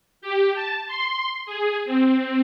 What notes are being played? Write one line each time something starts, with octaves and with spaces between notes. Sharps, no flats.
G4
A5
C6
G#4
C4